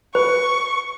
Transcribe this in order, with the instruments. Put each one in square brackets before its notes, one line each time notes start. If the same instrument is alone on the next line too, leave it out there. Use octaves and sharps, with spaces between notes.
[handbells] B4 [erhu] C#6